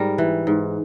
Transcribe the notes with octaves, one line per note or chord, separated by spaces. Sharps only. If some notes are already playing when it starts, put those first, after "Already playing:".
Already playing: G#2 G3 A#4
E3
G#2